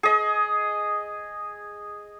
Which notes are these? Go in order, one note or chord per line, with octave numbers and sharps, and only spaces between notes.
G#4 D#5